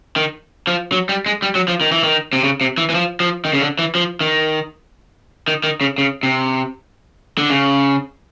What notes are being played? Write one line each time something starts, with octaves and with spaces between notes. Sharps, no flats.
D#3
F3
F#3
G3
G#3
G3
F#3
F3
D#3
E3
D#3
C3
C#3
C3
E3
E3
F3
F3
D#3
C#3
D3
E3
F3
D#3
D#3
D#3
C#3
C#3
C3
D3
C#3